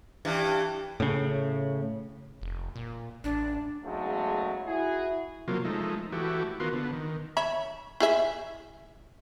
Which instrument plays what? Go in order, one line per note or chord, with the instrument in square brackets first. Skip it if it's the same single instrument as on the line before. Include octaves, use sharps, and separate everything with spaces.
[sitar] G2 E3
[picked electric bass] A2 C#3
[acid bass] F1
A#2
[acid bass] A1 [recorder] D4
[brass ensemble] E2 G#2 C#3 F#3 G#3 A3
E4 F#4 G#4
[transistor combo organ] C3 F#3 A#3 F4
F3 G#3 A3 D#4
E3 A3 F#4 G4
D#3 B3 F4 F#4 A#4 C6
D3 B3
D#3
[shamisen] C#5 E5 B5
E4 G#4 E5